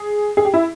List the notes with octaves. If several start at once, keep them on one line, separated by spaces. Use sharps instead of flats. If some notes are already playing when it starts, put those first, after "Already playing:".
Already playing: G#4
G#4
G4
E4